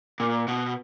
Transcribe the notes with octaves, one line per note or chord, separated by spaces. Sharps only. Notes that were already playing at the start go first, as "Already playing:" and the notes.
A#2
B2